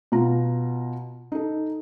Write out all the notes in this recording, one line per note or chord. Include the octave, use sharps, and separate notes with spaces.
B2 F4 A#5
D#4 A4